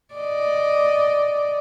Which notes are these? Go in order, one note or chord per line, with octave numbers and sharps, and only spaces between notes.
D5 D#5